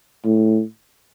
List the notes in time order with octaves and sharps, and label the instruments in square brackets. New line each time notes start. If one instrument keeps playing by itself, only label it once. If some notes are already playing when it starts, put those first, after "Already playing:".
[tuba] A2